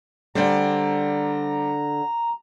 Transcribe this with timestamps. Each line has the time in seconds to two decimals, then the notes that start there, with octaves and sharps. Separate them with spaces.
0.35 D3 G3 C4 C5 D5 A#5